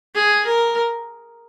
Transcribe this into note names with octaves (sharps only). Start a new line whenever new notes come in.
G#4
A#4